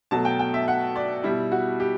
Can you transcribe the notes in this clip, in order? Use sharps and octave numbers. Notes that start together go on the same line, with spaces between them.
B2 F#3 A3 A5
G5
G5
E5
F#5
D5
B2 G3 E4
F#4
G4